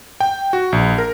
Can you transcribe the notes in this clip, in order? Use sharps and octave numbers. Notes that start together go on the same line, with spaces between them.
G5
F#4
A#1
A#4